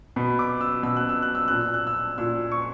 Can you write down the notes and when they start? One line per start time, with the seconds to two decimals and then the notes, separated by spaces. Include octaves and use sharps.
0.16 B2 B5
0.39 D6
0.61 E6
0.83 B2 E6
0.96 F#6
1.09 E6
1.22 F#6
1.35 E6
1.48 A#2 F#6
1.61 E6
1.74 F#6
1.87 E6
2.18 A#2 E6
2.52 C#6